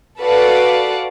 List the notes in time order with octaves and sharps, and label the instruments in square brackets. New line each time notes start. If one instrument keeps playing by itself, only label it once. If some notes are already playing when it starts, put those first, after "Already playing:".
[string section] F#4 A4 B4 D5 F5 F#5